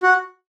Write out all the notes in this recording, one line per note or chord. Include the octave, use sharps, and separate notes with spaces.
F#4